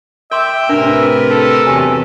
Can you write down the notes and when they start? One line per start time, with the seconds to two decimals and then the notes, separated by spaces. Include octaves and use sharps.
0.31 A#4 E5 G5 C6 D6
0.69 A2 C3 D4 A#4 B4
1.31 A4
1.67 E2 C3 F#3 G4 G#5